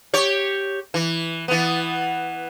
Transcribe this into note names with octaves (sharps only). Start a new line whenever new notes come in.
G4 C#5
E3
E3 B3